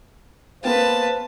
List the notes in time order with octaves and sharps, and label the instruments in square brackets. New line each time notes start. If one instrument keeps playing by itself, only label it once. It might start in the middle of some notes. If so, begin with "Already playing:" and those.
[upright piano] A#3 B3 G5 [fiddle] B4 A5 [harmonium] C5 F5